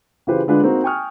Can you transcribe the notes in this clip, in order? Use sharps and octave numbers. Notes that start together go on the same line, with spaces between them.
C#3 E3 F4 G4 B4 C5
D3 G#3 D4 F4 B4
A#3 C4 D#4 F#4
G5 G#5 C#6 D#6 F6